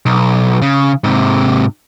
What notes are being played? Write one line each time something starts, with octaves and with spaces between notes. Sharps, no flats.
B1
C#3
G#2 C3